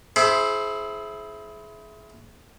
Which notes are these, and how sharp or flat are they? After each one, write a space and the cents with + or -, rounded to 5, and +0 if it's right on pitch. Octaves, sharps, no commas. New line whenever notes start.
E4 +0 G#4 +30 C5 +0